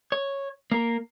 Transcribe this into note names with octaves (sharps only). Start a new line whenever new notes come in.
C#5
A#3 A#4